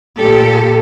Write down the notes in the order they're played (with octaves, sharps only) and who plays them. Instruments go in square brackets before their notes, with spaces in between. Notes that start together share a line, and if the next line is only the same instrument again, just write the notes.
[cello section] A#2 G4 A4